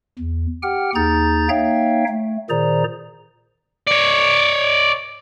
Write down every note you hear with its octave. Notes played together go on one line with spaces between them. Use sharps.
E2
G4 F#5 G5 F6
D#2 D#4 G#4 A#5 G6 A6
A#3 D#4 C#5 E5 F5 G5
A3
A#2 D#3 G#4 C5 D5 A#5
C#5 D5